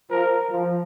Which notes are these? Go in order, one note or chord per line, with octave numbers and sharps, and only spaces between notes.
F3 A#4
F3